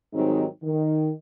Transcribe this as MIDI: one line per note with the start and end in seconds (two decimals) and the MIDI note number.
0.13 0.45 44
0.13 0.45 51
0.13 0.45 54
0.13 0.45 55
0.13 0.45 60
0.13 0.45 63
0.63 1.10 51